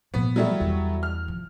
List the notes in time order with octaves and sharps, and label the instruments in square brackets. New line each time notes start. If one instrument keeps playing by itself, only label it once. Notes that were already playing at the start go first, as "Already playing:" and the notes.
[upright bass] A#2 F3 [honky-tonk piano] B3
[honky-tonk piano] F#3 G3 A3
[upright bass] E2
[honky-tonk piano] F6
[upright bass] F3